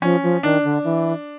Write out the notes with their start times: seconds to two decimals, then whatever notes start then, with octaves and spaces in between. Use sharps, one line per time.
0.02 F3 C#4
0.23 F3
0.43 D#3 D4
0.64 D3
0.84 E3